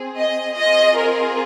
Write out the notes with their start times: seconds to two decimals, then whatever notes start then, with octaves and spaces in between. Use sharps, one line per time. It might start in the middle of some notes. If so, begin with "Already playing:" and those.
Already playing: C4 G#4
0.18 D#5
0.58 C4 F4 G#4 D#5
0.97 A#4